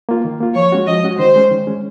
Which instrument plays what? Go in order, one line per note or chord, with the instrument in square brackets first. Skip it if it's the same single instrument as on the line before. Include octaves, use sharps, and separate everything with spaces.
[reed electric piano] A#3 F4
D#3
A#3 F4
[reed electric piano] F3 [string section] C#5
[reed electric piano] G#3 C#4 F#4
[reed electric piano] F3 [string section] D#5
[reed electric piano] G#3 C#4 F#4
[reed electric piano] D#3 [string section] C5
[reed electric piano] G#3 C#4
D#3
G#3 C#4